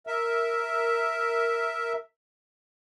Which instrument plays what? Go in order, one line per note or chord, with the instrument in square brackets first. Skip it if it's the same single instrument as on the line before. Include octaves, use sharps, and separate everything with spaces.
[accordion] A#4 E5